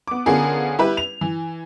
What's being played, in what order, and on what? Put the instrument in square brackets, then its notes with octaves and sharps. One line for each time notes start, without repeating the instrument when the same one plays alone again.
[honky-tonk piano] B3 D6
D3 B3 C#4 F4 G#4 A#4
G3 E4 G4 B4
F7
E3